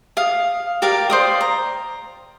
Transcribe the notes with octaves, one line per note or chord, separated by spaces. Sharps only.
F5 D#6
G4 A#4 D5 F5
C5 D5 D#6
A#5